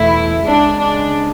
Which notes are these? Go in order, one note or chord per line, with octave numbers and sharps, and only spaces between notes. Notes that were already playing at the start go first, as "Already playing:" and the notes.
Already playing: E2 B2 A3 E4
C#2 C#3 G#3 D4
D4